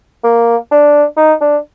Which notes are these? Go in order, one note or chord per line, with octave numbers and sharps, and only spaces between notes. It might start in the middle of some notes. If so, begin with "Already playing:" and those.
A#3
D4
D#4
D4